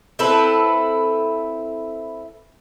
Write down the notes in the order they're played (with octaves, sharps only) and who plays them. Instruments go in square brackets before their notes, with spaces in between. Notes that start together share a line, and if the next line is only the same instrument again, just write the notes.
[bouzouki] C4 E4 A4 B4